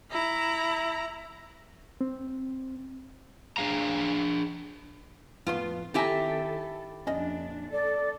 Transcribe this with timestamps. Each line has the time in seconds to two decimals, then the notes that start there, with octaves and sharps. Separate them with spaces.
0.11 E4 A#5
2.01 C4
3.57 D4 G#4 F5 A#5
5.47 F2 A2 B3 F4 C6
5.94 D#3 C4 E4 G4 A4 E5 G#5 A#5
7.07 F2 A#2 C#4 D4 D#5
7.72 A4 D5